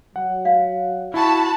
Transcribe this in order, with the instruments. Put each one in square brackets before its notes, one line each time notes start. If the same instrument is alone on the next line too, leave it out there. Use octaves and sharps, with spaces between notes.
[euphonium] F#3 [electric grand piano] F#5
[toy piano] F5
[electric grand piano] E4 [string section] F#4 A5 B5